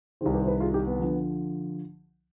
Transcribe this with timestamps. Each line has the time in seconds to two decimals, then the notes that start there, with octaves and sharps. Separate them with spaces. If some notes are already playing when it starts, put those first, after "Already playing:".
0.21 C2 C3 D#3 G#4 C5
0.34 G4 B4
0.43 C5
0.47 G4 B4
0.60 F4 G#4
0.74 D#4 G4
0.87 B3
1.00 D3 F3